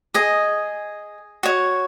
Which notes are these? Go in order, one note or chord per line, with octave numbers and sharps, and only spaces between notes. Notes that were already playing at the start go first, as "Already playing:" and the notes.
G#4 D#5 G#5
F#4 C#5